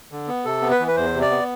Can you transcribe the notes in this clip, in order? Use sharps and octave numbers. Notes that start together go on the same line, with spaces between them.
D3
B3
C3 A4
B3
B4
E3
B4
E2 C5
C3
D5
B3